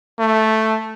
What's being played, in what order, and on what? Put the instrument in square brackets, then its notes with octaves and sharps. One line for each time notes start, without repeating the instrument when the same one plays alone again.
[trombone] A3